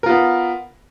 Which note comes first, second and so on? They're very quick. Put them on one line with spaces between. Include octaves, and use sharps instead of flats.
A#4 F4 B3